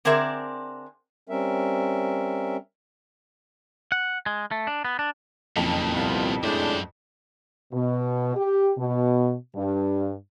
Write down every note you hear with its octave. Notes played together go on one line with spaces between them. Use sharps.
D3 C4 D4 G#4 A#4 E5
G3 C4 C#4 A#4 E5
F#5
G#3
A3
D4
B3
D4
F#1 F2 A#2 D#3
C2 B3 F4
F#2 A2 G#3 D4 C5
B2
G4
B2
G2